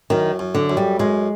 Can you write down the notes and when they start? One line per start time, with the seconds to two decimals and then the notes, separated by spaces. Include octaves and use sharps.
0.10 F#2 D#3
0.39 F#2
0.54 D3
0.70 F#2
0.77 G3
1.00 F#2 G#3